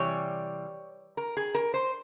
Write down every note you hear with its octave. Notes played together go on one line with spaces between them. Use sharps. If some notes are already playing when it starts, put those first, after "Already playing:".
Already playing: C3 E3 G3 C#5
A#4
G#4
A#4
C5